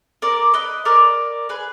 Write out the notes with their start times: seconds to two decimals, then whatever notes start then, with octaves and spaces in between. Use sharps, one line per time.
0.22 A#4 D5
0.54 B4 D#5
0.85 A#4 D5
1.49 G#4 B4